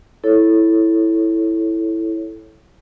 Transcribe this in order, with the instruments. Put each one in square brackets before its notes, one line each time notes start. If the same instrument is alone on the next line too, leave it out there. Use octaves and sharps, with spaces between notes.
[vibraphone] E4 A4 C#5